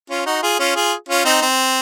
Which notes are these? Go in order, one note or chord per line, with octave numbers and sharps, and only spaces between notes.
C#4 F4
D#4 F#4
F4 G#4
C#4 F4
F4 G#4
C#4 F4
C4 D#4
C4